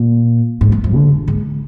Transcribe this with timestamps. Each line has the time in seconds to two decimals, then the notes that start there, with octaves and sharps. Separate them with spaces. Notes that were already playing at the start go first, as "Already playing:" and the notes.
Already playing: A#2
0.61 G#2
0.72 G2
0.84 F2
0.95 D3
1.28 G#2